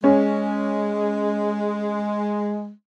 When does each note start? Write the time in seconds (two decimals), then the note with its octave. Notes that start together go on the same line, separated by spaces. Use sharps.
0.04 G#3 C#4